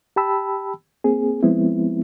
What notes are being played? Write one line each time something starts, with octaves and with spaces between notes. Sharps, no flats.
G4 G5 A5 B5 E6
A#3 C4 G#4
F3 G#3 B3 C4 E4